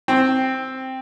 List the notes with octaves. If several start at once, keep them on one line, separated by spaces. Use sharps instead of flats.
C4